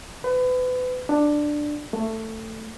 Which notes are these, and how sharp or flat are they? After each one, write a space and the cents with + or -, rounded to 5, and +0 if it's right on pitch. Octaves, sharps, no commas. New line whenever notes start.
B4 +35
D4 +10
A3 +15